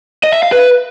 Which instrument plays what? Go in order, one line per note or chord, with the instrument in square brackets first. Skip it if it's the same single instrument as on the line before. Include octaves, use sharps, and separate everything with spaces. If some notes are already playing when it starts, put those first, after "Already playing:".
[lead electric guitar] D#5
E5
F5
B4